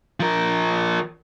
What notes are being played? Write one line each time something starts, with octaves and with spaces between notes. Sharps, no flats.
F3 A#4